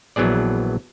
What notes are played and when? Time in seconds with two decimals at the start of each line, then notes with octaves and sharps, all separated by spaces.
0.16 A#1 E3 F#3 B3 G#4 D5